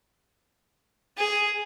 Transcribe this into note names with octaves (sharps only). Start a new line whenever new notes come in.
G#4